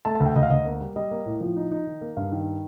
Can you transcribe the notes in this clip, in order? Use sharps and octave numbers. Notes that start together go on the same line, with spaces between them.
A3 A5
A5
D2
G5
D2 D#5
F5
D2 D#5
A#3
G3
G3 D#5
A#3
A2
F3
D#4
D#4
D#3
A#3
G2 F5
D#3